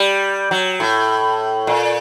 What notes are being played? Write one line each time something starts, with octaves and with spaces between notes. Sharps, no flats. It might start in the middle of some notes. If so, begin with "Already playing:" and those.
Already playing: G3
F#3
A2
A#2